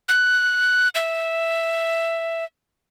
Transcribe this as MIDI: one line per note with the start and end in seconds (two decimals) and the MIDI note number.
0.09 0.89 90
0.95 2.45 76